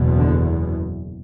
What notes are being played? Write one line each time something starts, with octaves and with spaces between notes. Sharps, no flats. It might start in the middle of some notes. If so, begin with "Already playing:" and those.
Already playing: F#1 E2 B2
D3